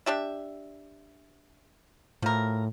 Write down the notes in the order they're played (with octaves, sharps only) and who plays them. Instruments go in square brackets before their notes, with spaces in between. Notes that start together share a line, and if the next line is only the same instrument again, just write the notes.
[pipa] D4 G4 E5
[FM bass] A2 [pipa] F3 A#4